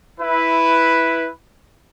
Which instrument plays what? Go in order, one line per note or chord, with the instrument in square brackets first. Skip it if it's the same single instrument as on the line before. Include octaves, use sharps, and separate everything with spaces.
[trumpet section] E4 B4